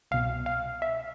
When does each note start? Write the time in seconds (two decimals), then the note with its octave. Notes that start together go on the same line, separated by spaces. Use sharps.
0.11 C2 B2 F5
0.46 F5
0.82 E5